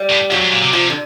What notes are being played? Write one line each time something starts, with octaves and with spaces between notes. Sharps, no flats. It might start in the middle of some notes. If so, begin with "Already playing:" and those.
Already playing: G3
A2
F2 F#3
G#2
A#2
C3
C3 F3
D3